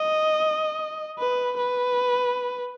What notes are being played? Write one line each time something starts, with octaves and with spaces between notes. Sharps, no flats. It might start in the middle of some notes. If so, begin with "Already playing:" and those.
Already playing: D#5
B4
B4